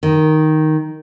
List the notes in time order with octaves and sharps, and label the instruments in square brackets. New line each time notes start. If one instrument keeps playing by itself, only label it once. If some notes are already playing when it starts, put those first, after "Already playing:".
[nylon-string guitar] D#3